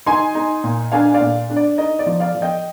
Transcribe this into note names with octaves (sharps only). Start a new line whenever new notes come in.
D#4 G#5 C6
D#4
A#2
D4 F5 G#5
D5 F5
A#2
D4
D5
D#4 D#5
D5
F3
D5 F5
F3
D#5 G5